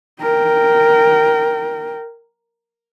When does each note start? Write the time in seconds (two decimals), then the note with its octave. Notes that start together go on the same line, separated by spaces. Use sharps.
0.22 A#4 G5